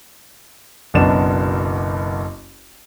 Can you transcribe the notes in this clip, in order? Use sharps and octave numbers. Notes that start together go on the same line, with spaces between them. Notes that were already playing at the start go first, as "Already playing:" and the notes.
F#1 B1 F#2 B3 D4 E7